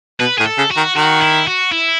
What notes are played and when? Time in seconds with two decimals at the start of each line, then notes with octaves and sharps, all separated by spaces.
0.20 B2 B4
0.38 A2 G#4
0.46 A4
0.58 C#3
0.71 F#4
0.77 D#3
0.96 D#3 F#4
1.21 E4
1.47 F#4
1.72 E4